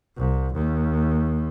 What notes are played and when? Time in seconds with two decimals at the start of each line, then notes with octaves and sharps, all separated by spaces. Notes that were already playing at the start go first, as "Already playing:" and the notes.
0.17 C2
0.53 D#2